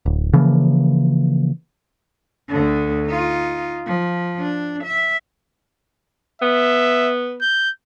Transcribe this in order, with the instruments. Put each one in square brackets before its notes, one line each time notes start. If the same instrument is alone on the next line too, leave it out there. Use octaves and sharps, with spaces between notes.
[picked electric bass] D1
C#3 E3 F3 A#3
[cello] D2 D3
D#4 F4
F3
D4
E5
[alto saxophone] B3 [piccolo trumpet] E5
[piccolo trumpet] G6